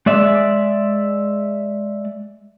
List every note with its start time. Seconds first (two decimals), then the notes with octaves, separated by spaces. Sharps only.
0.06 G#3 D5 E5